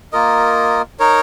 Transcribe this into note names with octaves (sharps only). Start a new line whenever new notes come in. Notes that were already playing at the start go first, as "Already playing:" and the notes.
A#3 F4 A#4 D#5
D#4 A#4 C#5